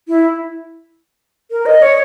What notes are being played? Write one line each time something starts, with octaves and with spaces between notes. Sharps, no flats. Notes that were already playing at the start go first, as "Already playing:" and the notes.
E4
A#4
D#5
C#5